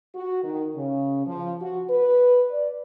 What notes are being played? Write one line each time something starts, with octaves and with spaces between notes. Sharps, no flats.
F#4
D#3
C#3
F3
F#4
B4
D5